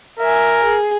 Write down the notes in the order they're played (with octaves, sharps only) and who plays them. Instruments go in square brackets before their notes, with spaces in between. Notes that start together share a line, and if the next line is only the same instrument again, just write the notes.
[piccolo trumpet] A#4 [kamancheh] E5 G#5
[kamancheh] G#4